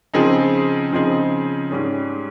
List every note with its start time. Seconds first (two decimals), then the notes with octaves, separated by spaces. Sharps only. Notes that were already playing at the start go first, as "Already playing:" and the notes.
0.14 C#3 F3 C4 D#4 G#4
0.92 C#3 F3 C4 D#4 G#4
1.71 G#2 G3 C#4 G#4